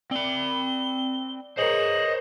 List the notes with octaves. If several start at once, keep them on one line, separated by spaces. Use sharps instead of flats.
C4 D5 B5 G7
G#4 A#4 C5 C#5 D#5 F#7